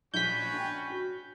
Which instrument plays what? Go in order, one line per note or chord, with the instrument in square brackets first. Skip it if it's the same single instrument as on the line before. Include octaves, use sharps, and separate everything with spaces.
[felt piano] A#1 [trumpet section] C#4 F#4 B4 [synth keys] G6 B6
[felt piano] D4 G5
F#4